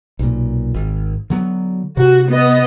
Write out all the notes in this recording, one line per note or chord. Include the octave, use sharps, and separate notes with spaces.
B1 A#2
G#1
D3 F#3 B3
C3 F#4
B3 D#5